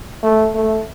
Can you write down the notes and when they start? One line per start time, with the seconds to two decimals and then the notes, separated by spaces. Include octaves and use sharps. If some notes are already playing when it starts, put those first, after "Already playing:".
0.23 A3
0.55 A3